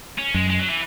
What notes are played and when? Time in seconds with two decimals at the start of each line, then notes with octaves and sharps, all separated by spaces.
0.18 C#4
0.34 F#2 G#3
0.50 G#3
0.59 F#3
0.69 E3